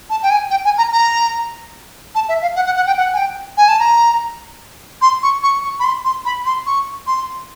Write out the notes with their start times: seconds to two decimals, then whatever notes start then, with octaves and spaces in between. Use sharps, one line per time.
0.10 A5
0.23 G5
0.30 G#5
0.51 G5
0.65 G#5
0.78 A#5
0.92 A#5
2.15 A5
2.29 E5
2.42 F5
2.56 F#5
2.66 F#5
2.76 F#5
2.87 G5
2.97 F#5
3.14 G#5
3.17 G5
3.57 G#5
3.68 A5
3.79 A#5
5.02 C6
5.23 C#6
5.43 C#6
5.64 C#6
5.80 B5
5.84 C6
6.05 C6
6.25 B5
6.46 C6
6.66 C#6
7.07 C6